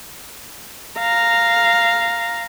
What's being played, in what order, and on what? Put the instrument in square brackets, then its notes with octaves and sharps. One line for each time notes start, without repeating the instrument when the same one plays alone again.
[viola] F5 A#5